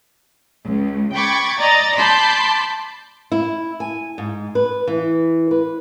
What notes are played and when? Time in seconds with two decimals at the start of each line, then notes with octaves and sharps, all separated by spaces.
0.65 C#2
1.15 G5 B5 C#6 D6 G#6 A6
1.59 D5 D#5 A#5 A6
1.98 A5 B5 C6 D6 G6 B6
3.32 E4
3.80 G#5
4.18 G#2
4.55 B4
4.87 E3
5.51 B4